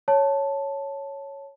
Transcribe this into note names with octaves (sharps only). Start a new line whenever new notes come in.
C#5 A5